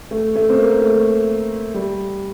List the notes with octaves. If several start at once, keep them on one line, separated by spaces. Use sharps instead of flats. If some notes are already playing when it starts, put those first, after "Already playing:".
A3
A3
C4
A#3
A3
G3